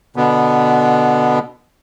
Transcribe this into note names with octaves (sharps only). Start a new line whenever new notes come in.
B2 D3 B3